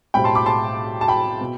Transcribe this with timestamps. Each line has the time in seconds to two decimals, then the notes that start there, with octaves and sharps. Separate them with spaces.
0.14 B1 A2 G3 C4 G5 B5
0.24 A5 C6
0.35 B5 D6
0.46 A5 C6
1.01 A5
1.08 G5 B5
1.41 B2